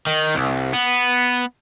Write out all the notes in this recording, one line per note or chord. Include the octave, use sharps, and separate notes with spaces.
D#3
C2
B3